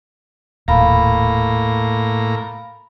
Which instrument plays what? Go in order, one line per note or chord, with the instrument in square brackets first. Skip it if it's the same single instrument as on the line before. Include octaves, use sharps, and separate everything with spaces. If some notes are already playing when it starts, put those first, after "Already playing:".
[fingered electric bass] D#1 [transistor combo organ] A2 A#3 A#5 [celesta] F5 B5